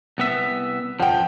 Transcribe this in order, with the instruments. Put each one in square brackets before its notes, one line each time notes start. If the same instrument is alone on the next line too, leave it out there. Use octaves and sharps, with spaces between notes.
[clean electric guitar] C2 B3 E5
[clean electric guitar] F3 [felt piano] F#5 G5